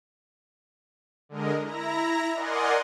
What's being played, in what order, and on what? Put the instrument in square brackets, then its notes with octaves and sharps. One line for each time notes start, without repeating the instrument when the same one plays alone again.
[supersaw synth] D3 G#3 A#4 D#5
E4 A#5 A#6
A#4 D5 D#5 F#5 G#5 C6